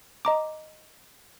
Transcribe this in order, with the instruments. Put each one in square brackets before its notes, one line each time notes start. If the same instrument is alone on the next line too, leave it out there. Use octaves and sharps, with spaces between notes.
[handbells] D#5 A#5 D6